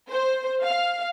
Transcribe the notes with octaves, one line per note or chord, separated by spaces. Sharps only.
C5
F5